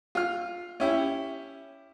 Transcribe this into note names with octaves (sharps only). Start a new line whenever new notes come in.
F4 F6
C#4 E4 G4